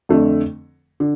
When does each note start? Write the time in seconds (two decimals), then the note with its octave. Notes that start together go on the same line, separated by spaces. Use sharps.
0.09 F2 D3 A3
1.00 D3